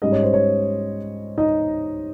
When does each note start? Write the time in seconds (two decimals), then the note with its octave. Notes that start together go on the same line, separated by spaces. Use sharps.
0.02 G#2 G3 C#4 D#5
0.12 C#5
0.23 C5
0.33 C#5
1.38 D#4 D#5